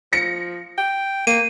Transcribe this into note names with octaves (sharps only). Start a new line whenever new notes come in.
F3 A#6 C#7
G5
A#3 D#7